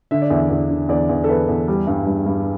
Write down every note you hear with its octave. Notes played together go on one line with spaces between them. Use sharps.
D3 E5
D5
E2 E5
E2
D3
E2 D5
E2
A4
E2 B4
E2
G3
G2
G2
G2